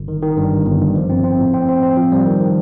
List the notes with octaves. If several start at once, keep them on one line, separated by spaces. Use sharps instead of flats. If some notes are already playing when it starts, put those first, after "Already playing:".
Already playing: G1
D#3
D#3
G2
G1
G1
G2
F3
C4
C4
A2
C4
C4
C4
F3
G3
D#3
D#3